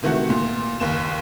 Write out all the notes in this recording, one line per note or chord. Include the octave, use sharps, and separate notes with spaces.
C3 D#3 E3 A3 F#4
A#2
F#1 D#2 E7